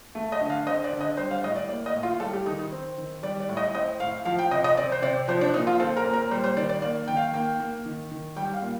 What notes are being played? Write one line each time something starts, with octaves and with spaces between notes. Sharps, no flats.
A3
D#5
D3
F5
C4 D#5
D5
D3
D#5
G3 C5
F5
A2 D#5
D5
A#3 D5
D#5
A2
F4
G3 A4
G4
D#3 D#4
D#4
C4
D#3
G3 D5
D5
A2
D#5
C4 D#5
A2 F5
F3 F5
G5
C3 D#5
D#5
C4 D5
C5
C3 D5
F3 C5
D4
A#2 D#4
F4
C4 A4
A#4
A#2
A#4
G3 C5
C5
D#3 D5
D5
A#3 D5
D#3 G5
F5
A#3 G5
A#3
D#3
D#3
G3 G5
F5
A#2